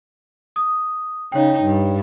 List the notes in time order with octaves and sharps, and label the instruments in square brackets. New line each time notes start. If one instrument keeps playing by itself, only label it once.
[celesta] D#6
[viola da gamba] C#3 D#4 [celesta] C#5 G5
[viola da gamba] G2